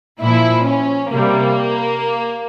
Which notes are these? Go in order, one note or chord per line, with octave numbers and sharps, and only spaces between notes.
A#2 F3 E4
C#4
C3 G3 A#3